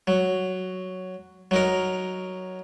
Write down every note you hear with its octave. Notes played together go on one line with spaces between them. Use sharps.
F#3
F#3 D#4 A#4